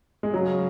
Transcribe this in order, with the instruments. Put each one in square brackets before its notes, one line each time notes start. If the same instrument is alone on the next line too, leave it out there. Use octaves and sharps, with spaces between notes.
[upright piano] G#3
[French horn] C#3 [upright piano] F#3